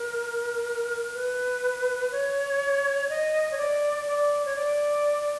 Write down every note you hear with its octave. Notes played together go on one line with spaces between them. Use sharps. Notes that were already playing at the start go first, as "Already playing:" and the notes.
Already playing: A#4
B4
C#5
D#5
C#5
D5
D5
C#5
D5